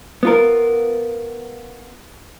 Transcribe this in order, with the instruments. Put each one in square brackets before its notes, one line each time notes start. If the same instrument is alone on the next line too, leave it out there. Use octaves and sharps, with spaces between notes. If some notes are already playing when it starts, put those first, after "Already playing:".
[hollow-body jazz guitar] B3 F4 A#4